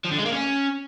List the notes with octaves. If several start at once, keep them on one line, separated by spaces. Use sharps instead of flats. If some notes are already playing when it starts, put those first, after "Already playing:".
F3
D3
G#3
A#3
C#4